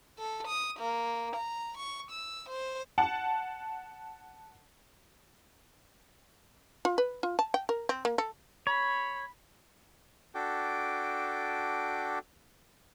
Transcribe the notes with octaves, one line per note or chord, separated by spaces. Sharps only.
A4
D#6
A#3
A#5
C#6
E6
C5
F#5 A5
F4
B4
F4
A5
G5
A#4
C4
A#3
A4
C#5 B5
D4 F#4 A4 G5 D6